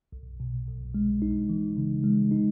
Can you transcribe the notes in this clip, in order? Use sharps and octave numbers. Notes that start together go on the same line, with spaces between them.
B1
B2
B1
G#3
D#4
E3
C#3
G#3
D#4